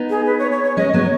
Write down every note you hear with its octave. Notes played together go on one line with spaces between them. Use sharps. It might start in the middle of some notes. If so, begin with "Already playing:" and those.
Already playing: B3 D#4
G#4
B4
C#5
C#5
C#5
G#3 C#4 D#5
F#3 B3 C#5